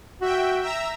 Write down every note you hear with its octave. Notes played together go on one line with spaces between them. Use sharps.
F#4 E5 G5
E5 A#5 E6